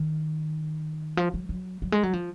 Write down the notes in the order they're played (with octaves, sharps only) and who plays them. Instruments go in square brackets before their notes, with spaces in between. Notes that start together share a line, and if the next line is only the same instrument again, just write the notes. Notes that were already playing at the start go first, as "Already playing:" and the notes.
Already playing: [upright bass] D#3
F3
F#3
F#3
F#3
G#3
F#3
F3